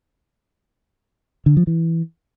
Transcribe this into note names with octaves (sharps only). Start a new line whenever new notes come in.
D3
F3
E3